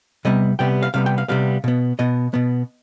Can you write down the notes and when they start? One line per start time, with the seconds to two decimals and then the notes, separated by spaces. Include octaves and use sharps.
0.25 C3 G3 B3 D#5
0.59 C3 G3 B3 G5
0.83 F5
0.94 C3 G3 B3 F5
1.06 G5
1.18 F5
1.28 C3 G3 B3 F5
1.64 B2 B3
1.99 B2 B3 D#5
2.34 B2 B3